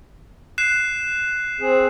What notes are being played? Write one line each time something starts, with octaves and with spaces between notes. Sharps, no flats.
F#6 C7 E7
C4 G#4